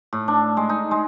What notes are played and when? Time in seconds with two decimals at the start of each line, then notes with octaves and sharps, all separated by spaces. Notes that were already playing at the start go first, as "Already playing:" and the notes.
0.13 A2
0.28 D4
0.57 G#3
0.69 D#4
0.91 G#3